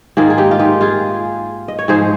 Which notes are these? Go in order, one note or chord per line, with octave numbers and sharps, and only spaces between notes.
G#2 D#3 A#3 F4 G#4
G#4
D#4 G4
F4
D#4 G4
F4 G#4
D#5
C#5
G#2 F3 G#3 G#4 C5